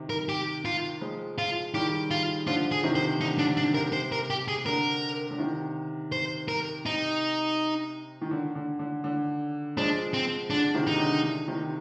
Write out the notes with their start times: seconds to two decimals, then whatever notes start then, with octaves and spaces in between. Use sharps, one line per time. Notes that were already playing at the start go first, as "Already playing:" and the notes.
Already playing: C3 D#3
0.10 A#4
0.29 G4
0.65 F4
1.01 F3 G#3
1.38 F4
1.74 D#3 G3 G4
2.11 F4
2.47 D3 F3 F4
2.71 G#4
2.84 C3 D#3
2.95 C5
3.20 D3 D#4
3.38 D3 D4
3.57 D3 D4
3.74 C3 A#4
3.93 C5
4.12 A#4
4.30 G4
4.48 G#4
4.66 D3 A#4
5.31 D3
5.39 C3 D#3
6.12 C5
6.48 A#4
6.86 C3 D#4
8.21 D#3
8.31 D3
8.55 D3
8.79 D3
9.04 D3
9.77 F3 G#3 D4
10.13 C4
10.50 D3 D4
10.74 C3 D#3
10.87 D#4
10.99 D3
11.23 D3
11.48 C3 D#3